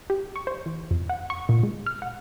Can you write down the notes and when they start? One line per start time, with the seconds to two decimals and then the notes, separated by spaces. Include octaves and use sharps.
0.10 G4
0.36 C#6
0.47 C5
0.66 E3
0.91 F2
1.10 F#5
1.30 C#6
1.49 A#2
1.63 G#3
1.86 F6
2.02 F#5